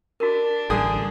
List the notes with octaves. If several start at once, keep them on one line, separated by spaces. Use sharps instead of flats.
D4 F#4 A#4
A1 D3 G3 G#4 D#6